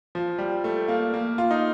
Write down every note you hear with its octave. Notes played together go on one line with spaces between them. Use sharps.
F3
G3
A3
A#3
A#3
F4
D#4